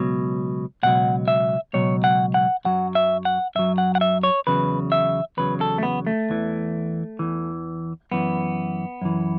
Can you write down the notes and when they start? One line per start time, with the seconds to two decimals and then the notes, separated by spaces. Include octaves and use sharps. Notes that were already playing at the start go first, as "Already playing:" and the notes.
Already playing: C#2 B2 F#3
0.83 C#2 B2 F#3 F#5
1.28 E5
1.73 C#2 B2 F#3 C#5
2.04 F#5
2.34 F#5
2.65 F#2 F#3 F#5
2.95 E5
3.25 F#5
3.55 F#2 F#3 E5
3.78 F#5
3.95 F#5
4.01 E5
4.23 C#5
4.47 E2 C#3 F#3 B4
4.92 E5
5.37 E2 C#3 F#3 B4
5.61 A4
5.78 A3
5.83 B3
6.07 A3
6.29 E2 E3
7.19 E2 E3
8.11 F#2 E3 B3
9.02 F#2 E3